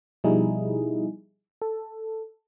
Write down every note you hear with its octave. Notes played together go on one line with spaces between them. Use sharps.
B2 F3 G3 D#4 E4 G#4
A4